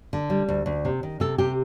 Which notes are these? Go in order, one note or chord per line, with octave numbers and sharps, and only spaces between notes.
D3
G3
D2
D2
C3
D#3
C3 A4
C3 G4